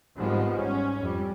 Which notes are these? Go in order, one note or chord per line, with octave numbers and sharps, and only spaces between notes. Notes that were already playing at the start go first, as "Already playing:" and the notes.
G#1 G#2 F3 G3 G#3 B3
C#4
F2 G3